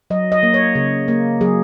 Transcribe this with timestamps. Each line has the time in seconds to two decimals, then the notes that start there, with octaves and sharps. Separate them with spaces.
0.10 F#3 D#5
0.32 D#5
0.43 A#3
0.54 C#5
0.75 C#3
1.08 A#3
1.41 F#3 G#4